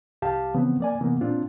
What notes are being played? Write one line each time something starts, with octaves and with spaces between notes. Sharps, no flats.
C2 G4 F5 A5
C#3 E3 F3 B3 C4
A#3 D5 G#5
C3 E3 A#3 B3
A#2 C4 D4 F4